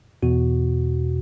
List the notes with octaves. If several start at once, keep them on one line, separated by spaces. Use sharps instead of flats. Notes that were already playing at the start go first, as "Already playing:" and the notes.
E2 B2 F#4